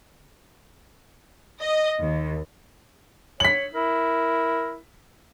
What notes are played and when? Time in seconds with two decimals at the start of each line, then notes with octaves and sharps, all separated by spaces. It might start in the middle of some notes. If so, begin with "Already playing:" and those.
1.60 D#5
2.01 D#2
3.40 C#5 B6 F#7
3.75 E4 A#4